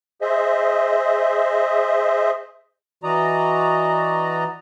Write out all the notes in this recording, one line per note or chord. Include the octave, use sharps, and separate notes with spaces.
G#4 C5 D#5 E5
E3 F#4 D5 D#5 A#5